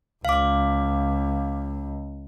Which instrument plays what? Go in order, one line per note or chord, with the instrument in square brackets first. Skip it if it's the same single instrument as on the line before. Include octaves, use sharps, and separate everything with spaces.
[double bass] C#2 [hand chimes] F5 D6